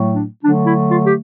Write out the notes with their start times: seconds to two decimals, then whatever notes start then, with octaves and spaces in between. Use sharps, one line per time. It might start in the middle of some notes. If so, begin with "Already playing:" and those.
Already playing: A2 F#3 A3
0.14 D4
0.43 D3 F#3 A3 D4
0.66 E4
0.89 F4
1.04 G4